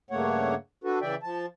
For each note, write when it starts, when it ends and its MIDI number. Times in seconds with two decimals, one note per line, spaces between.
0.11 0.55 43
0.11 0.55 49
0.11 0.55 57
0.11 0.55 58
0.11 0.55 73
0.11 0.55 78
0.84 0.99 62
0.84 0.99 66
0.84 0.99 69
0.84 0.99 71
1.02 1.15 49
1.02 1.15 52
1.02 1.15 74
1.02 1.15 76
1.02 1.15 79
1.23 1.46 53
1.23 1.46 81